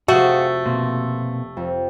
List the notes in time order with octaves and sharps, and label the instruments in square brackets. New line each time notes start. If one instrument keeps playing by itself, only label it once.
[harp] F1 C3 [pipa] A3 [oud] F#4 [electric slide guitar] G#4 F5 F#5
[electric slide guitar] B2 A#3 C4
[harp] F2